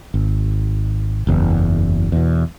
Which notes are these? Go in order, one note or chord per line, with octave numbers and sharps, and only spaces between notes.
G#1
F#1 E2
E2 B2